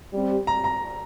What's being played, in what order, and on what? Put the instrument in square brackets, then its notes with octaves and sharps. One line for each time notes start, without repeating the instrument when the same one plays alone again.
[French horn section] G3 C4 G4
[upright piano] A#5
A#5